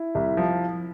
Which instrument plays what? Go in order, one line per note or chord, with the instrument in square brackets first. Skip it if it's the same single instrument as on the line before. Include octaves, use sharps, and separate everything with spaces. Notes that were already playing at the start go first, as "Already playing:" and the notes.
Already playing: [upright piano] E4
C2
F3